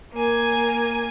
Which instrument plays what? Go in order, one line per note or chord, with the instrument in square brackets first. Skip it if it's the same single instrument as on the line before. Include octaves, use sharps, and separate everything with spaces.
[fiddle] A#3 G#5